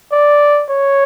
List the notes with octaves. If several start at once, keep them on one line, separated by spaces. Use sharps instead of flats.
D5
C#5